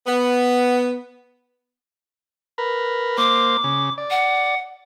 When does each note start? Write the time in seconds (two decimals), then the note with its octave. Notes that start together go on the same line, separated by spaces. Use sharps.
0.06 B3
2.58 A#4 B4
3.18 A#3 C5 D6
3.64 C#3
3.98 D5
4.10 F#5